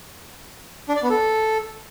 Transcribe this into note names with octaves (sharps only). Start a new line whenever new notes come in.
D4
D5
B3
A4